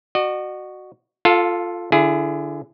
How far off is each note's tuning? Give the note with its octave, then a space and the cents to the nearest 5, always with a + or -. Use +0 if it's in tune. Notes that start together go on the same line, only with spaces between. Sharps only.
F#4 +0 D#5 -45
F4 +0 A4 +0 F5 +35
D3 +0 E4 +35 G#4 +0